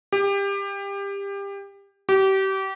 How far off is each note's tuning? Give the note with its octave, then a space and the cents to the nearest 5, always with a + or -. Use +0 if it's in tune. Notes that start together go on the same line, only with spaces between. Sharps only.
G4 +25
G4 -30